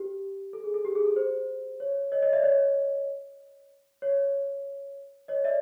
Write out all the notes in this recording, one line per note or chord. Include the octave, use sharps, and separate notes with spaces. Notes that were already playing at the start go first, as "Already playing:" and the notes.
Already playing: G4
A4
G#4
A4
G4
G#4
A4
C5
C#5
C#5 D#5
C#5 D#5
D5 E5
C#5 D#5
C#5
C#5 D#5
D5 E5